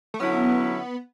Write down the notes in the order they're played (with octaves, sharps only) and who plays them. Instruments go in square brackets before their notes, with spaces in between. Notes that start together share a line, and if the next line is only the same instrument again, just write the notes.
[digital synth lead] A3
[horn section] D3 F#3 C#4 E4 [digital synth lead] B3